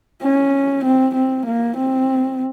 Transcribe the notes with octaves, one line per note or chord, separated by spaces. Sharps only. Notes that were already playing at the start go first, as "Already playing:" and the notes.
C#4
C4
C4
A#3
C4